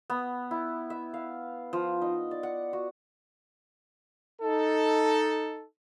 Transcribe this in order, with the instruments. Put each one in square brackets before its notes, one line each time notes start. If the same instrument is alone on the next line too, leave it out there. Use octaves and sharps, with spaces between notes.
[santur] B3
E4
E5
F5
F3
D#4
D5
F#5
F#4
[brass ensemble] D#4 A4